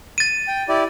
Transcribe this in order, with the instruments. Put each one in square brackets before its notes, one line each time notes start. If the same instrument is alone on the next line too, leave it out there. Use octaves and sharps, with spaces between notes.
[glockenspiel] A6 D#7
[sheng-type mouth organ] G5
E4 G4 D5